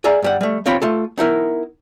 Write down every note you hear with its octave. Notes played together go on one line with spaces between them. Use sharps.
G#4 D5 E5 F5 A#5
G2 G3 F#5
G3 A3
D#2 C4 F4 C#5 G5 B5
A3 F4 A4
B3 D#4 E4 A#4